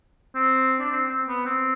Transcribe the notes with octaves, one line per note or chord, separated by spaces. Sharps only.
C4
D4
C4
C4
B3
C4